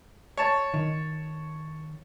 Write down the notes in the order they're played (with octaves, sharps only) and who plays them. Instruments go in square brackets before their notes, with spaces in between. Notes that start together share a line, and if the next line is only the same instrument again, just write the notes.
[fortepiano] C#5 A5
[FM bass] D#3